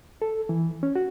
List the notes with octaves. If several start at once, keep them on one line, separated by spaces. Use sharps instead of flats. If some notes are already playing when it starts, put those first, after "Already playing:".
A4
E3
C#4
F#4